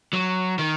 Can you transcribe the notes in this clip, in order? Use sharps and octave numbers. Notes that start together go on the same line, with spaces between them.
F#3
D#3